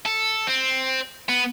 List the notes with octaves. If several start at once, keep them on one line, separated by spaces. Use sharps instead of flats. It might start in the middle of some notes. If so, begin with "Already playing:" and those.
A4
C4
B3